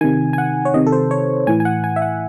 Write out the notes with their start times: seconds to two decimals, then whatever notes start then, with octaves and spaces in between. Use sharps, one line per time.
0.01 C3 D#3 G#5
0.33 G#5
0.38 F#5
0.65 C#5
0.74 C3 D#3 D#5
0.87 A4
0.92 C5
1.11 C#5
1.47 A2 E3 G#5
1.60 G#5
1.65 F#5
1.84 G#5
1.96 E5
2.02 F#5